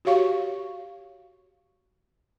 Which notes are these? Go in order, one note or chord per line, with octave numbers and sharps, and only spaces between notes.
F#4 G4 C#5 F5 C#6